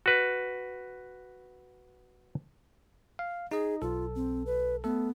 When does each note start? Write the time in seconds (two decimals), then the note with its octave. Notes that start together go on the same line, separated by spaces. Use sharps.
0.06 F#4 B4
3.19 F5
3.51 D#4 G#4 D#5
3.82 B1 F4 A4
4.15 C4
4.46 B4
4.84 A3 B3 A4